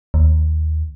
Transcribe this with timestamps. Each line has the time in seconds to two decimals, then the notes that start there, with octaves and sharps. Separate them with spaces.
0.14 D#2